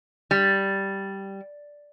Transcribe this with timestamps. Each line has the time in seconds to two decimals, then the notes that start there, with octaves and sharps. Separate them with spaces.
0.31 G3